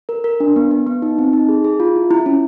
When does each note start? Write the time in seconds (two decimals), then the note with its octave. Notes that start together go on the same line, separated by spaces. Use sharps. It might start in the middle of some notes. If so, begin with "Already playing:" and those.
0.09 A#4
0.24 A#4
0.40 D4
0.56 B3
0.71 B3
0.87 B3
1.02 D#4
1.18 C4
1.33 D#4
1.49 G#4
1.64 G#4
1.80 F4
1.96 E4
2.11 E4
2.26 C#4